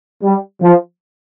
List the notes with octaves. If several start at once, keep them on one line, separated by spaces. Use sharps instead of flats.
G3
F3